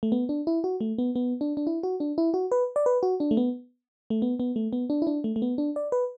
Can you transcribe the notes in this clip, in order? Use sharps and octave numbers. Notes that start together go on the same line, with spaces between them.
A3
B3
D4
E4
F#4
A3
B3
B3
D4
D4
E4
F#4
D4
E4
F#4
B4
D5
B4
F#4
D4
A3
B3
A3
B3
B3
A3
B3
D4
E4
D4
A3
A3
B3
D4
D5
B4